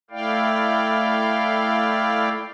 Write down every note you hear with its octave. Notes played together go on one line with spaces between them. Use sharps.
A3 E4 D5 F5 G5